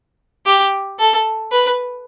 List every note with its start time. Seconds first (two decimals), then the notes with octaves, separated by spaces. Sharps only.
0.46 G4
0.99 A4
1.52 B4